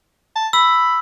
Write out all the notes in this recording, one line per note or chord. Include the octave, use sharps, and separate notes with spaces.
A5
B5 E6